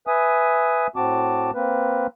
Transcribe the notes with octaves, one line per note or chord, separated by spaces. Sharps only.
B4 E5 G#5 D#6
A2 C4 F#4 A5 D6
A#3 C4 B4